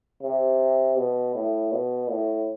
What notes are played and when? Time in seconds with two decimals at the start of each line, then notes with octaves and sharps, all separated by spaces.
0.22 C3
0.97 B2
1.35 A2
1.72 B2
2.10 A2